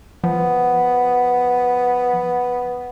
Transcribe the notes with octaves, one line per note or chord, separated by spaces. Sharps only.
F3 B3